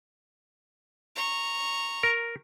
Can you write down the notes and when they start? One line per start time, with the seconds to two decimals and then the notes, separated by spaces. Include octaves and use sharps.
1.16 A#5 C#6
2.03 A#4